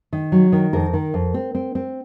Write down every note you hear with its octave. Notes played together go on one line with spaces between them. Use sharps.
D#3
F#3
D#3
F2 A#4
D#3
F2
C4
C4
C4